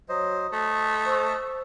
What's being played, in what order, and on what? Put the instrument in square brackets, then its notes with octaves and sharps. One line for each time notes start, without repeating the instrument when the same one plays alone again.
[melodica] F#3 C5 D#5
[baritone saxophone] A3 [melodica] D#5
[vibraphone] C5 C#6 E6